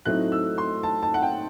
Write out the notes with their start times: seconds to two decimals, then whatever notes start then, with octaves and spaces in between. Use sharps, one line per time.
0.05 A2 F#3 A3 C4 D#4 F#6
0.32 E6
0.58 C6
0.83 A5
1.02 A5
1.14 F#5
1.22 G5